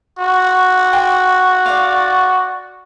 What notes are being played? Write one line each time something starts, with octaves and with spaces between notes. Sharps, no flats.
F#4
G5 G#5 C6
D5 F5